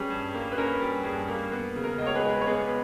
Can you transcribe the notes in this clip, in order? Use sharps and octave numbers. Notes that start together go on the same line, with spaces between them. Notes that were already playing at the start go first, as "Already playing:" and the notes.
Already playing: G3 C#4 G#4 B4
G2
A#3
B4
C#4 A#4
G3
G2 G#4
A#3
B3
C#3
A#4
C#2 D#5
C#5
G#4 B4
G#3
C#5
B3 G#4 B4